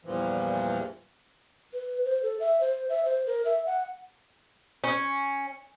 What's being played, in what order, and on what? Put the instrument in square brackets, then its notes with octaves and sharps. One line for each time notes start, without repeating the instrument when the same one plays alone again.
[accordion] E2 G2 A#2 E3 F3
[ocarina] B4
C5
A4
E5
C5
E5
C5
A#4
E5
F#5
[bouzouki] C#4